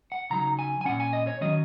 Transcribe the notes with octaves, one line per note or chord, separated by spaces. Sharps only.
F#5
C#3 F#3 D#4 A#5
G#5
G#5
A#2 A#3 C#4 F#5
G#5
D#5
C#5
D#3 F#3 C#4 D#5